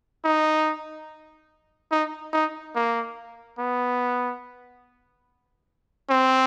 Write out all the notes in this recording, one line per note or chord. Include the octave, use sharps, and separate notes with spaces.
D#4
D#4
D#4
A#3
B3
C4